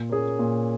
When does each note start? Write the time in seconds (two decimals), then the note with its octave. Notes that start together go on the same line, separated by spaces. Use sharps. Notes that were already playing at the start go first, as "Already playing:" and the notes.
Already playing: A#2
0.10 A#3 C#4 G#4
0.39 A#2